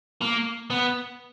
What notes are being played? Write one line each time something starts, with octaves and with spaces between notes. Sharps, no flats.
A#3
B3